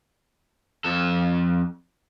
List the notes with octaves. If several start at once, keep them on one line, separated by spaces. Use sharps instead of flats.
F2 A4